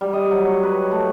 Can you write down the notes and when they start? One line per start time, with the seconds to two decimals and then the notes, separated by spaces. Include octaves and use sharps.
0.01 G3
0.13 D#5
0.31 F#3
0.47 C#5
0.63 B4
0.91 A3